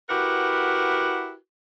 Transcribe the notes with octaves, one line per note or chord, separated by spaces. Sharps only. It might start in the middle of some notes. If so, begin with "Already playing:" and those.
E4 F#4 G4 A#4 B4 F#5